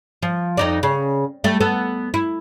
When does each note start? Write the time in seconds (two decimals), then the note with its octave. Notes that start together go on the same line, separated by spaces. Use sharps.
0.22 F3
0.57 F2 D#4 D5
0.83 C#3
1.44 G3 A3
1.60 B3 A4
2.14 E4